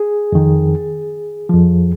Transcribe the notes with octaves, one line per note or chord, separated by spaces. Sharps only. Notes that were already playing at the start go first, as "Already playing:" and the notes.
Already playing: G#4
F2 D#3
F2 F3